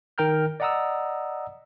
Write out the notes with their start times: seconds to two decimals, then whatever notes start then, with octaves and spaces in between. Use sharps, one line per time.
0.18 D#3 A#4 G5 A#5 F6 G6
0.60 D5 D#5 F#5 A#5 D#6 E6